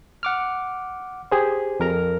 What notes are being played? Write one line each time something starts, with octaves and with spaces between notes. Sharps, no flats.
F#5 D6 F6
G4 G#4 C5
F2 A#4 A#5